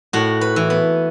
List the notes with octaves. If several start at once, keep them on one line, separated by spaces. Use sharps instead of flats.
A2 F#4
B4
E3
B3